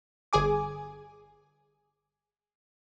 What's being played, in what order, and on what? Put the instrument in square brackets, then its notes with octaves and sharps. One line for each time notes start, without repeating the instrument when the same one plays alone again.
[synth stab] G1 G#4 G#5 D6